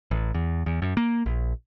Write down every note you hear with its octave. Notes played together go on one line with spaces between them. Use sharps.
A1
E2
E2
F#2
A#3
A#1